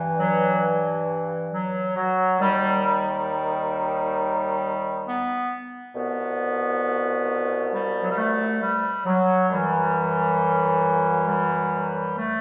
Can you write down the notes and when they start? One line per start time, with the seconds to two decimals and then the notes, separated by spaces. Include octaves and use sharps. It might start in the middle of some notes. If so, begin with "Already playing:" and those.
Already playing: G2 E3
0.18 F#3
1.51 F#3
1.96 F#3
2.40 D#2 D#3 G3
2.84 G3
5.06 B3
5.95 C2 B2 B3
7.73 G3
8.01 F#3
8.09 G3
8.17 A3
8.61 G3
9.06 F#3
9.50 F#2 E3 G3
11.28 G3
12.17 A3